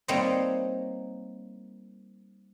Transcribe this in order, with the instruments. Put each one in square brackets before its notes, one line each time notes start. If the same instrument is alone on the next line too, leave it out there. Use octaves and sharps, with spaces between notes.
[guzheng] G3 A#3 C4 D#4 C#5 D#5